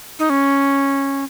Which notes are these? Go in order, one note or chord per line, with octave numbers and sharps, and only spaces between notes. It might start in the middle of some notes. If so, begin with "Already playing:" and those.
D#4
C#4